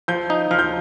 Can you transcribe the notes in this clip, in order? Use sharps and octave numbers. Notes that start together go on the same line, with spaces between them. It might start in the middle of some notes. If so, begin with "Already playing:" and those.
F3 G6
D#4
F3 F6
G6